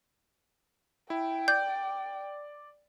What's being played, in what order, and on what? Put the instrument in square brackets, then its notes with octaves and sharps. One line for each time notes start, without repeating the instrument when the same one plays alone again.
[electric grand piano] E4 [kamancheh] G5
[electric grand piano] D5 [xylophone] G6